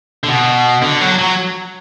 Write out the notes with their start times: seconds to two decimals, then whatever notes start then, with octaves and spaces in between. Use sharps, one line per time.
0.24 D3
0.29 B2
0.82 D3
1.01 F#3
1.19 F#3